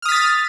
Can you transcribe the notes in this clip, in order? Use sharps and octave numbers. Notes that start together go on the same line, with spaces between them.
D#6 F6 A6 B6